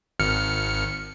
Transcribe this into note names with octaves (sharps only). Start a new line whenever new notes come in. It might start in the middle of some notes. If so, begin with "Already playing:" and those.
G#1 F6 C#7